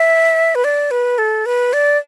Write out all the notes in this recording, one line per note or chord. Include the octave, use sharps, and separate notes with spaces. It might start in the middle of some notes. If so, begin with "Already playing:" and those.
Already playing: E5
B4
D5
B4
A4
B4
D5